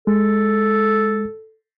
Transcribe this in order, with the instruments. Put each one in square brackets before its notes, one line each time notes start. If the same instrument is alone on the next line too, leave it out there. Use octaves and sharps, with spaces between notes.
[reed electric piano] G#3 [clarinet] A4